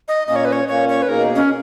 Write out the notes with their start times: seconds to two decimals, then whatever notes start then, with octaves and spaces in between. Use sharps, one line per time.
0.08 D#5
0.27 A#2 A#3 C#4 D#5
0.36 C#5
0.45 B4
0.52 C#5
0.68 A#2 A#3 C#4 C#5
0.89 C#5
1.02 B4
1.08 B2 A#3 D#4 G#4 A#4
1.35 C#4